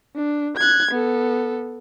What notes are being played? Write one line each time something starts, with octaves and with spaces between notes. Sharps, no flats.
D4
F#6 G#6
B3 A4